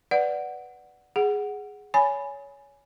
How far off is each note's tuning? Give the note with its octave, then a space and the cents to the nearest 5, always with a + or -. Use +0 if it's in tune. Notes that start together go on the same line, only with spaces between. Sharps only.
B4 +0 D5 +0 F#5 +0
G#4 +0 F#5 +0
C#5 +20 G#5 +5 B5 +0